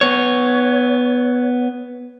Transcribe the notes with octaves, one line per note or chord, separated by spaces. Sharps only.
B3 C#5